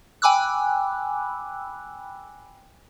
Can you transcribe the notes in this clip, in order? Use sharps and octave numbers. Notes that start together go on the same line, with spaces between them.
G5 G#5 B5 D6 E6 F#6